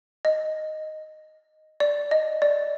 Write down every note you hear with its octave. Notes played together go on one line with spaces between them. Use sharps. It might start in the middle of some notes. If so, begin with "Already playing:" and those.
D#5
D5
D#5
D5